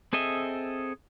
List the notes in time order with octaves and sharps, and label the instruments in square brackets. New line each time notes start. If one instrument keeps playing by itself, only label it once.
[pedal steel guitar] C4 G#4 A4 D#5 E5